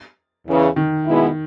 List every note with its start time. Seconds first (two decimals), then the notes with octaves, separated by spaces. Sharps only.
0.47 E2 C#3 E3
0.76 D#3
1.06 B2 G#3 B3 E4